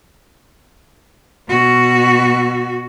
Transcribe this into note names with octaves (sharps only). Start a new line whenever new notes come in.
B2 F#4